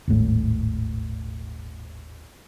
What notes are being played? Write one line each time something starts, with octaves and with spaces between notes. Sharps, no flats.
D#1 G#1 A2